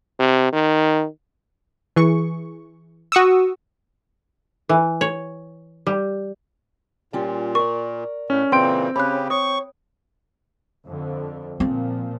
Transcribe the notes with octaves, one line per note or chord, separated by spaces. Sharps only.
C3
D#3
E3 G#4 C#6
F#4 C#6 D#6 E6
E3
C#5
G3
A#2 G3 C#4 F4
A#4 D5 C#6
A2 C#4
A#2 C#3 E3 C4 G5 C6 D7
C#3 C#4 G4 B5 F#6
C#5 C#6 D#6
F2 D3
A#2 F3 C4